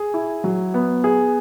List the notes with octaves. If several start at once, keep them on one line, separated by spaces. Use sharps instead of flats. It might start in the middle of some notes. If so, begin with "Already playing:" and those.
Already playing: G#4
E4
F#3
B3
G#4